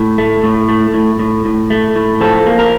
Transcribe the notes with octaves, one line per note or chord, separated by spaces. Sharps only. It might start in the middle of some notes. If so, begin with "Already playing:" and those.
Already playing: A2
A3
A2
A3
A2
A2
A2
A3
A2
F3 A4
A#3
A#4